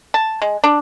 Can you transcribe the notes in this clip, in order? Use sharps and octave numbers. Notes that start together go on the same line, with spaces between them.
A5
G#3
D4